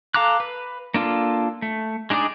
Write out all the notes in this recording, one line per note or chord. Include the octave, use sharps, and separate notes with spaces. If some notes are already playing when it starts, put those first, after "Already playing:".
A4 F5 A#5 D6 F#6
B4
A#3 D4 F4 A4
A3
G#3 D4 D#4 G#4 D5